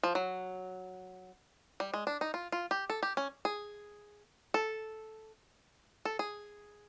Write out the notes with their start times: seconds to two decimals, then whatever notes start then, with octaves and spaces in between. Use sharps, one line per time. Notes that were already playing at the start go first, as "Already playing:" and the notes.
0.03 F3
0.15 F#3
1.80 G3
1.94 G#3
2.07 D4
2.21 D#4
2.34 F4
2.52 F4
2.71 G4
2.90 A4
3.03 G4
3.17 C#4
3.45 G#4
4.54 A4
6.05 A4
6.19 G#4